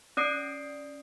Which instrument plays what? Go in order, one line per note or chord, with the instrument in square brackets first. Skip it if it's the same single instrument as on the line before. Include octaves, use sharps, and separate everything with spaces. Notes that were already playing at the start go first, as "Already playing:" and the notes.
[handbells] C#4 D5 D#6 C7 D7